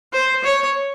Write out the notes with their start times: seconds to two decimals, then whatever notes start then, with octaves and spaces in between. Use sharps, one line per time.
0.13 C5
0.44 C#5